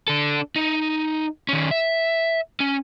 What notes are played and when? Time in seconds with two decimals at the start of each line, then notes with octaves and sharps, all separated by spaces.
0.08 D4 A4
0.56 D#4
1.49 D#3 C#4
1.71 E5
2.60 C#4